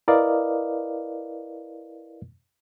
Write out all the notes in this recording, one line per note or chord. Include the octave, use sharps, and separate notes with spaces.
E4 A#4 B4 D5 D#5 F5